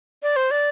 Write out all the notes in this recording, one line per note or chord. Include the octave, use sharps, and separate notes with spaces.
D5
C5
D5